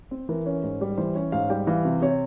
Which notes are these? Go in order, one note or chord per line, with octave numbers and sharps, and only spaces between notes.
C4
E3 A#4
C#4
G#2
G3
E3 C5
C#4 C#5
G#2 F5
G3 G5
E3 F5
C3
C3 C#5